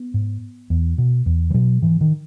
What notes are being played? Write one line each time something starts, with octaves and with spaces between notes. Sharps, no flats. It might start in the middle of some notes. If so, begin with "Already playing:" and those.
Already playing: B3
G#2
E2
B2
E2
E3
B2 F#3
G#2 E3
D#3